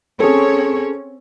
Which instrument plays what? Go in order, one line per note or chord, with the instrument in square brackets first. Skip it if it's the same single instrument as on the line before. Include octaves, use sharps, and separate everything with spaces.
[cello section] C4 C#4 C#5 [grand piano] G#4 A4